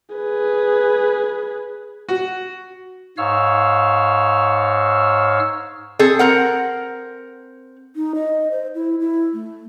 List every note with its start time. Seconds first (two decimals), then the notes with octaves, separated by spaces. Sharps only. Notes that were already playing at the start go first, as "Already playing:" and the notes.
0.15 G#4 B4
2.09 F#4
3.18 G#2 C#5 F5 E6 F6
5.99 C4 G#4 A4
6.19 C4 A#4 F#5
7.96 D#4
8.15 D#5
8.51 C5
8.75 E4
9.00 E4
9.33 A3